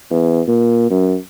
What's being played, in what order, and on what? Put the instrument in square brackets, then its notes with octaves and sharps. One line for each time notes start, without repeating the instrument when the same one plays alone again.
[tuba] E2
A#2
F#2